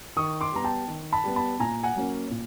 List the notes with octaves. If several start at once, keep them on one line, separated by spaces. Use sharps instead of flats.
D#3 C#6 D#6
C6 D6
G3 B3 A#5
G5 A5
D#3
A5 B5
G3 B3
A5 B5
A#2 G#5 A#5
F#5 G#5
F#3 A#3 C#4
A#2